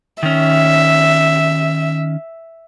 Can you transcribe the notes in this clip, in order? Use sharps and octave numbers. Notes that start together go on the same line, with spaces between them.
D#3 C#4 E5